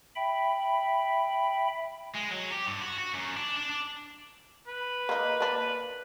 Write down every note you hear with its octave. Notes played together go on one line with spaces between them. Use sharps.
E5 G5 B5
G#3
F#3
G4
G2
F#4
F#4
F#2
D4
D4
D4
B4
A#3 D#4
A#3 D4